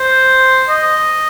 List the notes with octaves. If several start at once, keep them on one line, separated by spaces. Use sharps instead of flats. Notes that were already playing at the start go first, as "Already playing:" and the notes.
Already playing: C5
D#5